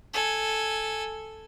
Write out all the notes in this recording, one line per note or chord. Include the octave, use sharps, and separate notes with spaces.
A4 G#5